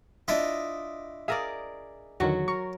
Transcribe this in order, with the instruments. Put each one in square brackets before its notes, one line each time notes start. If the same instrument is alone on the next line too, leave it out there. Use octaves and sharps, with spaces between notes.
[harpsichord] D4 E4 D#5 [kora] F4
[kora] G#4 A#4 D5 [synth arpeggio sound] E5 F5 D#6
[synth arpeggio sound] E2 D3 D#3 [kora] F#3 F#4
[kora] A#4 [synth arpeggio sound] C#6